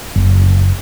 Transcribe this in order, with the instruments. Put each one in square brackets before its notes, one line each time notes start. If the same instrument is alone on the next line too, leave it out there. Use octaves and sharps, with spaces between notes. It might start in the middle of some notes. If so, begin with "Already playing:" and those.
[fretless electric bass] F#1